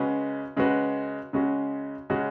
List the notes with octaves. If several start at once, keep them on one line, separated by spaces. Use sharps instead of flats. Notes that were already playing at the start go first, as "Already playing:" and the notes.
Already playing: C#3 G#3 C#4 F#4 B4
C#3 G#3 C#4 F#4 B4
C#3 G#3 C#4 F#4
C#3 G#3 C#4 F#4